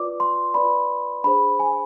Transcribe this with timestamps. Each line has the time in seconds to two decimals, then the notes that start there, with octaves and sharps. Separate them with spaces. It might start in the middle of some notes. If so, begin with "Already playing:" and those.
Already playing: F4 B4 D5 D6
0.20 C6
0.54 F4 B4 D5 B5
1.24 D4 G#4 C5 B5
1.60 G#5